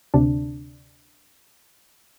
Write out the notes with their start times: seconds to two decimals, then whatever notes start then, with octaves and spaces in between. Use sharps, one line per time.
0.14 D2 C3 D4